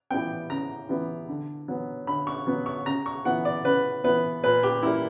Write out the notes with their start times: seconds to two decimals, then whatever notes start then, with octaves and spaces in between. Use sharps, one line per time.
0.11 E3 G3 B3 G5
0.50 C#3 A#5
0.89 E3 G3 B3
1.28 D3
1.68 F#3 B3
2.07 D3 B5
2.27 C#6
2.47 F#3 B3
2.66 C#6
2.86 C#3 A#5
3.06 C#6
3.25 E3 B3 F#5
3.45 D5
3.65 C#3 B4
4.04 E3 B3 B4
4.43 A#2 B4
4.63 G4
4.83 G3 A#3 E4